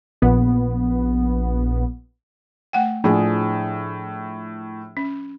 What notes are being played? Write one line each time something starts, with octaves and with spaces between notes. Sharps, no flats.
A#1 B3
A3 F#5 G5
A2 F3 D4 G#4
C#4